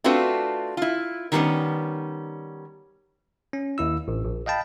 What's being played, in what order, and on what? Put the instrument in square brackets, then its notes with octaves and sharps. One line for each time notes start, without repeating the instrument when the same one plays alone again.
[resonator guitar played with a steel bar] A3 C4 D4 F4 F#4 B4
E4 F4
D#3 F#3 G3 A3 B3 C#4
[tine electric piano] C#4
D#2 E4 E6
A1
A#1
D#5 F5 G5 A5 B5